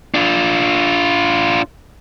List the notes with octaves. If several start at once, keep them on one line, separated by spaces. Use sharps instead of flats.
D4 F4